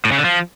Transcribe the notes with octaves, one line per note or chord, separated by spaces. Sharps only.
A2
C#3
D3
F3